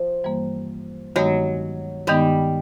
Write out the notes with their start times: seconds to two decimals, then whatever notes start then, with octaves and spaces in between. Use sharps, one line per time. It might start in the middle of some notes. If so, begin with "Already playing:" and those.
Already playing: F3
0.24 G2 E3 G3 A#3
1.16 G2 D#3 F#3 G#3 B3 D#4
2.07 G2 D#3 G3 G#3 B3 D#4